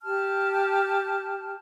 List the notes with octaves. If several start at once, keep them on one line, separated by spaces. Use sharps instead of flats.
G4 A5 F6